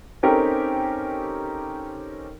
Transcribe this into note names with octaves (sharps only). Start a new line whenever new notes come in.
C4 C#4 D#4 G4 A4 A#4